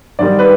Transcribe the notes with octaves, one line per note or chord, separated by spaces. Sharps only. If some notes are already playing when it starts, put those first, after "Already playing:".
G#2 D#3 G3 D5
B4